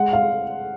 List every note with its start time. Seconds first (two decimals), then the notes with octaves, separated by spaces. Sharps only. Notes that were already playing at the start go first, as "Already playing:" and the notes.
Already playing: G#3 F#5
0.13 F5